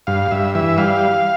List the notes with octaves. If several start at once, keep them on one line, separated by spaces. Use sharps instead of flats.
G2 F5
G2 E5
E3 E5
G3 F5